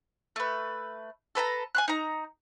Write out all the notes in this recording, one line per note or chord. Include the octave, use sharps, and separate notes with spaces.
A3 B4
A4 B4 A5 A#5
G#5 C6 F#6
D#4 A#5